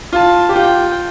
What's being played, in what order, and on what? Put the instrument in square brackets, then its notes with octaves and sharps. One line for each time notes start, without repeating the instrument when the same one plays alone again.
[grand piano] F4 [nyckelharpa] A5
[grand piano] G4
[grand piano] F4 [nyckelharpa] G5